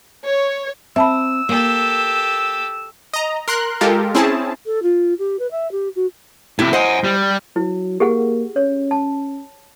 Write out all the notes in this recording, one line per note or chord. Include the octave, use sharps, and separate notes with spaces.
C#5
C4 E5 A5 B5 E6
A#3 G4 A4
D#5 A#5
A#4 C6 F#6
G#3 F4 G4 A4 A#4
C4 C#4 E4 G#4 A5
A4
F4
G4
B4
E5
G4
F#4
A2 C3 E4 G4
C5 D#5 F#5 G#5
G3
F#3 E4
A#3 G4 G#4 F#5
C#4 C#5
A5